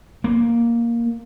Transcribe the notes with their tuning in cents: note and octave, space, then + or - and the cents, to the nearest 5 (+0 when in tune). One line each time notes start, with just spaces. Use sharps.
A#3 +5